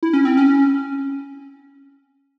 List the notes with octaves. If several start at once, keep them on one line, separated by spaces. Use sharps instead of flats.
E4
C#4
C4
C#4